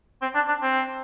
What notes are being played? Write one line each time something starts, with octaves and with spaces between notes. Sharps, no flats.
C4
D4
D4
C4